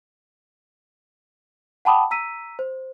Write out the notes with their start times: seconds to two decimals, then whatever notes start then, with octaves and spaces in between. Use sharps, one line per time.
1.85 F#5 G5 A5 B5 D6 D#6
2.11 A#5 E6 B6 D#7
2.59 C5